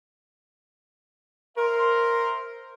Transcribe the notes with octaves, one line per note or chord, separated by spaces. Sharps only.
A#4 C5 E5 C6